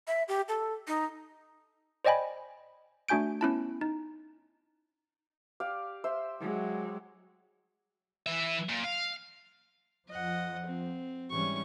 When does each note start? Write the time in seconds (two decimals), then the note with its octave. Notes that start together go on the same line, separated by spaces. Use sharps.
0.07 E5
0.28 G4
0.49 A4
0.87 D#4
2.05 C5 D5 D#5 G5 G#5 B5
3.09 A3 D4 F#4 G#5 G6 D7
3.41 B3 C#4 E4 A5
3.81 D#4
5.60 G4 D5 F5
6.04 C5 E5 C6
6.39 F#3 G#3
8.26 E3 E5
8.69 A#2
8.84 F5
10.09 F2 F3 D#5 F#5
10.66 C4
11.30 G#2 E3 G3 C#4 C#6